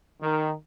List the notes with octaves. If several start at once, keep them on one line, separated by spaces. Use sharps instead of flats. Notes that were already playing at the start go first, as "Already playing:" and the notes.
D#3